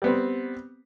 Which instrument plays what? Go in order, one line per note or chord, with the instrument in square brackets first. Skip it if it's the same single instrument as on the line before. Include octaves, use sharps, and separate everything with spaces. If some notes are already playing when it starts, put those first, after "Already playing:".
[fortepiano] G3 B3 C4